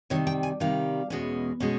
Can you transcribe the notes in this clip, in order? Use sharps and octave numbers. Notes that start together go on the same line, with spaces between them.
C3 D#3 G3 C#5
G5
G#5
C3 D#3 G3 F5
E2 B2 G#3 C#4
B2 G#3 C#4